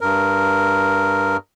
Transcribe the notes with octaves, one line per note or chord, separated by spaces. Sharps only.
G2 A#4